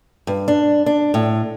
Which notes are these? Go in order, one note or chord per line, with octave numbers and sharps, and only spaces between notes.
G2
D4
D4
A2